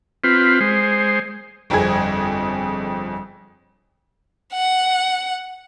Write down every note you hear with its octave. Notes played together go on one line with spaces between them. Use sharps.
C4 F4 B4
G#3 C5
G1 F2 C4 G#4 G#6
F#5